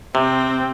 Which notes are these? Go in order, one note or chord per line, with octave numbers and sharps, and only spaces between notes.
C3 C4